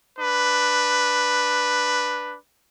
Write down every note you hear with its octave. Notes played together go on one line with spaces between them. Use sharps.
D4 B4